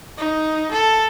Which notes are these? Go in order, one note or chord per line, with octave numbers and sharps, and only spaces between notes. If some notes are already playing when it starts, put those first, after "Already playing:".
D#4
A4